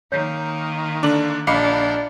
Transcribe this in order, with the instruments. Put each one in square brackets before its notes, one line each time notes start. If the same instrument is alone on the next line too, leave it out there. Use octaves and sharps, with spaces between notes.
[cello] D#3 A#3 [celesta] C#5 G6
[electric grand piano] D3 D4 [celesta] D6 F#7
[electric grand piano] A#1 F5 C#7 [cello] D4 [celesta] D#5 B5 D6